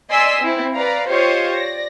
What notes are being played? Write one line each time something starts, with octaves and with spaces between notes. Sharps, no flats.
D5 D#5 G#5 C6 E6 B6
C4 E4
B4 D5 F5 A#5
F4 G4 C5 C#5 D#5
D5 A#6